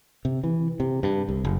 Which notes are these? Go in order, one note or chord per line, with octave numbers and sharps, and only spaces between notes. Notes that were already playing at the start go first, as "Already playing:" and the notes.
C3
E3
C3
G2
C2
F#1